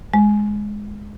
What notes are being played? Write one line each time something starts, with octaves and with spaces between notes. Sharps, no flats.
G#3